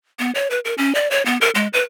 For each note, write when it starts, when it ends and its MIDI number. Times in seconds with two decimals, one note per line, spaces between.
0.19 0.31 59
0.35 0.48 73
0.50 0.60 71
0.65 0.74 70
0.78 0.95 61
0.95 1.08 74
1.11 1.24 73
1.26 1.38 59
1.41 1.50 70
1.55 1.67 56
1.73 1.82 71